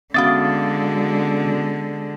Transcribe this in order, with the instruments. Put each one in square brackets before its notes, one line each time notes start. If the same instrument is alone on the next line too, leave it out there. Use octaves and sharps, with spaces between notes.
[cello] D3 G#3 [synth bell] B3 C#4 F#4 [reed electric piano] F5 D#6 A6